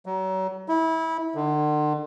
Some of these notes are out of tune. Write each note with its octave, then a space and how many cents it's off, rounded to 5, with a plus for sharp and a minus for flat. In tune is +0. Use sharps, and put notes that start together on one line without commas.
F#3 +35
E4 -25
D3 +40